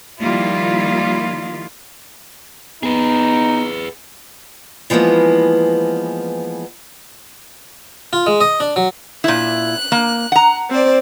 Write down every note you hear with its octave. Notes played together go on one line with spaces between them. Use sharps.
D#3 F3 G3 A#3 E4 F4
B3 D#4 G#4 B4
E3 F3 G#3 A#3 B3
F4
G#3
D#5
D4
F#3
A#2 E4 F#6
A#3
F#5 A#5
C4 C5 D5